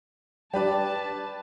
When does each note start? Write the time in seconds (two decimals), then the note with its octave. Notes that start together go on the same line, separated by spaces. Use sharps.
0.54 G3 D4 G4 B4 D5 A5